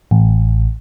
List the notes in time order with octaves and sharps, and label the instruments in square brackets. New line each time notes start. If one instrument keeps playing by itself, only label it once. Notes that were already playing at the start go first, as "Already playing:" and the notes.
[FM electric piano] A1